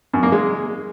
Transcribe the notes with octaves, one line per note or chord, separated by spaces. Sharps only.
F#2
A#3
G#3